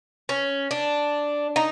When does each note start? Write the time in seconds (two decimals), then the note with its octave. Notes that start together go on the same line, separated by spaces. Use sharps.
0.29 C#4
0.71 D4
1.56 D#4